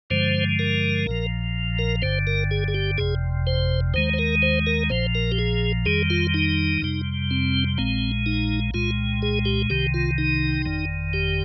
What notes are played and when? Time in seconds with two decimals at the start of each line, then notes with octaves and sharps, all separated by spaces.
0.10 G2 D3 F3 G#3 C5
0.59 A#4
1.07 A#1 A#2 F3
1.79 A#4
2.02 G1 G2 D3 C5
2.27 A#4
2.51 G#4
2.68 G#4
2.74 G4
2.98 G1 F2 C3 G#4
3.47 C5
3.94 D#2 D#3 G#3 C5
4.14 C5
4.18 A#4
4.42 C5
4.67 A#4
4.90 A#1 A#2 F3 C5
5.15 A#4
5.32 G4
5.39 G#4
5.86 F2 D#3 G3 G#4
6.10 F4
6.34 D#4
6.82 F2 C3 G3
7.31 C4
7.78 A#1 A#2 G#3 C4
8.26 D#4
8.74 C2 A#2 G#3 F4
9.22 G#4
9.45 G4
9.70 C2 C3 D#3 G4
9.94 F4
10.18 D#4
10.66 G1 F2 D#3
11.13 G4